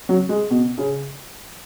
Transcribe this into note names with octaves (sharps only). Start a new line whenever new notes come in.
F#3
G#3
B2
C#3